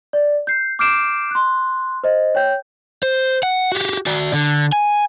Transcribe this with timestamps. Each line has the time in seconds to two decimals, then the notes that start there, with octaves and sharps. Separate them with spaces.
0.13 D5
0.47 G6 C7
0.79 D6 F6 G6 C7 D7 E7
1.31 C6 F#6
2.04 C5 D#5
2.35 C#5 G5 G6
3.03 C5
3.43 F#5
3.72 F#4 G4
4.06 F#4 D5
4.34 D3
4.72 G#5